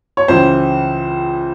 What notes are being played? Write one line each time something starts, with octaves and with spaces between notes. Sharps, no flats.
C#5
C#2 C#3 E3 C5